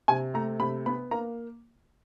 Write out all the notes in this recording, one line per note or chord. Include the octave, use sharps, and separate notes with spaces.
C3 G#5
A3 A#5
C3 B5
B3 B5
A#3 A#5